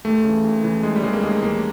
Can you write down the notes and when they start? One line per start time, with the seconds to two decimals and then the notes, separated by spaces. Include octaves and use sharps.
0.05 D#2 A3
0.24 C#3 E3
0.44 D#2
0.64 C#3 E3
0.83 D#2 G#3
0.96 G3
1.03 C#3 E3 G#3
1.13 A#3
1.23 D#2 G#3
1.43 C#3 E3 A#3